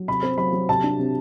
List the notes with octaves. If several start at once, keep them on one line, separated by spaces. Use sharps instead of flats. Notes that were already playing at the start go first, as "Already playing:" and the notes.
Already playing: F#3
C3 B5
C4
F#3 B5
F#3
C3 A5
D4
C3